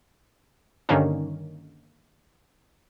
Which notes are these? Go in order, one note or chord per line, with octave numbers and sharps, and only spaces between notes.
G2 D3 D#3 A#3 C#4